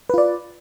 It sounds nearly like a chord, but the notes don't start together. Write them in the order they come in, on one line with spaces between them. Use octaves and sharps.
B4 F4 D5